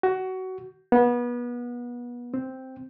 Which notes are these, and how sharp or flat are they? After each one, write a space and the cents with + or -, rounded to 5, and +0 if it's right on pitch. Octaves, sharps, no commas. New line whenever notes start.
F#4 +20
B3 -30
C4 +0